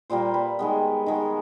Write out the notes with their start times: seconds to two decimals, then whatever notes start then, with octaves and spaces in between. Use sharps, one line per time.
0.10 A#2 G3 A#3 C5
0.34 B4
0.59 D#3 G#3 B3
1.06 D#3 G#3 B3